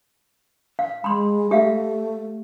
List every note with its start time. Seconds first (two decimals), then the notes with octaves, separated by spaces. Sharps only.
0.79 F5
1.04 G#3 B5 C6
1.51 A3 G4 E5 F5